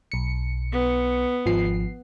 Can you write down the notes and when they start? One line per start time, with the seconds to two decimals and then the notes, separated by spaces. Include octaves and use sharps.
0.12 B1 C#7
0.72 B3
1.46 G#1 F3 C7